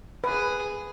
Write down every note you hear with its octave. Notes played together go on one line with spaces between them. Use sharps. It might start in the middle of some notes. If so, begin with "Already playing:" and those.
G#4 B4